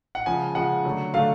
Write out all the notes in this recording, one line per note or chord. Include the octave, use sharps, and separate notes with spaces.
F#5
C#3 F3 G#3 G#5
C#3 F3 G#3 F#5
D3 F#3 A3
D3 F#3 A3 F5